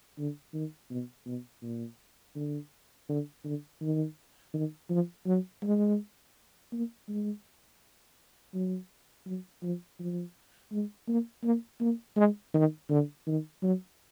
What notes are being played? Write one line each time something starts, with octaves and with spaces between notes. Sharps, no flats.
D3
D#3
B2
B2
A#2
D3
D3
D3
D#3
D#3
F3
F#3
G#3
A#3
G#3
F#3
F#3
F3
F3
G#3
A#3
A#3
A#3
G#3
D#3
D3
D#3
F#3